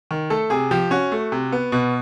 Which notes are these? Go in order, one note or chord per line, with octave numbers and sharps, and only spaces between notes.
D#3
A3 A4
C3 G#4
F3 G4
C#4 F#4
A3
C3
B3
B2